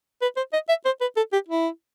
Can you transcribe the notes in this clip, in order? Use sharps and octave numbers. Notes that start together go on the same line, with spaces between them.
B4
C5
D#5
E5
C5
B4
A4
G4
E4